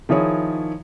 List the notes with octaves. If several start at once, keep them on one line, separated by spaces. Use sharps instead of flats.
D#3 F3 E4 G#4 C#5